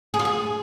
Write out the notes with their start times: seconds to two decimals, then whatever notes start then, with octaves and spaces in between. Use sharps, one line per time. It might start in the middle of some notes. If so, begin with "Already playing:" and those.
0.14 G#4
0.19 F4
0.25 G#4